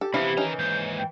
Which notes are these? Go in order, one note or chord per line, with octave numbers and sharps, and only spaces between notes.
G4 A4
C3 E3 F3 B3 E4 F4 B5
D#3 C#4 D#4 A#5
D#2 G#2 G6
G5